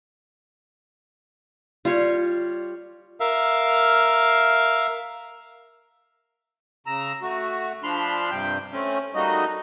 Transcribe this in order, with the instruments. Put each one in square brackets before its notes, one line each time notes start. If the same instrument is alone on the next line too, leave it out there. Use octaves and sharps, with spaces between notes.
[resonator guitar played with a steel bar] G3 [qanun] F4 C#5
[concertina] A#4 E5 F5
[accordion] C#3 A#5 E6
A3 F#4
F3 D4 B5 C6 F6
G2 C3 G3 G5 G6
A3 C4 C#4
G3 A3 A#3 D#4 F#4 D#5